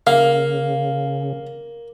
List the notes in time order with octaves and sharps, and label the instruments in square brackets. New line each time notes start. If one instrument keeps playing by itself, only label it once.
[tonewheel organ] C#3 [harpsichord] A#3 [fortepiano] F5